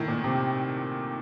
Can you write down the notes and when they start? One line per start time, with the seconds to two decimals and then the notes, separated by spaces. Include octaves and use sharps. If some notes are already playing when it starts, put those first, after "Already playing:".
Already playing: A2 D#3
0.08 A#2
0.24 C3